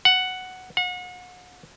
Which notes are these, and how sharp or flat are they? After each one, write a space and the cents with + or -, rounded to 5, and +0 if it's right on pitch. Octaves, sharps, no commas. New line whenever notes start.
F#5 +5
F#5 -35